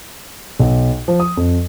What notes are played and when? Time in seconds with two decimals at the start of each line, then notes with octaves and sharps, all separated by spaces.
0.60 B1
1.08 F3
1.20 D#6
1.37 F2